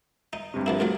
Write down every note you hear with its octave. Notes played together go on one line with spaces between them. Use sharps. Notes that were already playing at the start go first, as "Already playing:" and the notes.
D#4
G2 C3
F3 A#3 E4
A2 F3 F#3 A#4